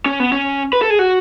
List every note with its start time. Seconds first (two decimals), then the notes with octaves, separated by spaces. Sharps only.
0.06 C#4
0.20 B3
0.32 C#4
0.73 B4
0.82 A4
0.90 G#4
0.99 F#4